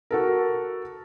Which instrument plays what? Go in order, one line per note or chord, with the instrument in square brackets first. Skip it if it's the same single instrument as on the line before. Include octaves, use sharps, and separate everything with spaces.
[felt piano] F#4 A4 A#4